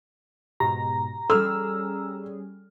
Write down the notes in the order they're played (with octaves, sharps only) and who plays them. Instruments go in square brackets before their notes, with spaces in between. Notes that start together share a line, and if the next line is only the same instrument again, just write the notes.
[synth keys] G#2 B2 [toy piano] G4 [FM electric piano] A#5
[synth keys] G3 C#4 G#4 [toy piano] A4 C6 D6 [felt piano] E6 F6